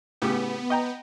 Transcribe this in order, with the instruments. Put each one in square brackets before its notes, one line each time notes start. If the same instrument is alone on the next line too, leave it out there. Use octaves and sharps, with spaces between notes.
[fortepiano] A2 C#3 G4 [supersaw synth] B3
[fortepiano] D#5 G5 A#5